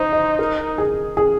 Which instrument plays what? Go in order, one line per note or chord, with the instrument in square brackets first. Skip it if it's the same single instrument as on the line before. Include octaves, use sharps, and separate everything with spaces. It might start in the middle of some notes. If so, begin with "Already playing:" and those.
Already playing: [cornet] D#4 [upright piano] C5
[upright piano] D#5
A#4
G#4
G#4